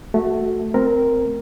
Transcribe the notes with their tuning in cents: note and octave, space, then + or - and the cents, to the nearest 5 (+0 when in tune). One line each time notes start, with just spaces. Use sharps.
A3 +0 F#4 +0
A3 +0 C4 -10 A#4 +0